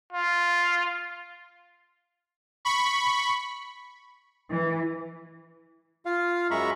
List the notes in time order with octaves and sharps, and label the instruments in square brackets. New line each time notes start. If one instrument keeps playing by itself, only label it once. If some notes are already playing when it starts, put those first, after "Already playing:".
[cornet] F4
[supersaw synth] B5 C#6
[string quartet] E3
[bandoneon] F4 F5
F#2 G#3 E5 A#5 B5 C#6